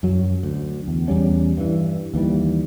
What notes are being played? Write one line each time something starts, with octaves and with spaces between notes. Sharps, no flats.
F#2 F#3
D2
E2
E2 G3 C#4
G2 E3
D#2 E3 G3